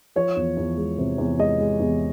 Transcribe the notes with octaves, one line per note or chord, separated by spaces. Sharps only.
F3 C#5
E2
E2
G#3
C3
E2
G#3 D#5
G#3
E2